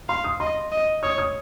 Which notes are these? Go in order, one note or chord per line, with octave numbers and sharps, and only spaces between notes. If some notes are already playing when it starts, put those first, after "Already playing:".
F5 C6
D#6
D#5 C6
D#5
C#5 D#6
D#6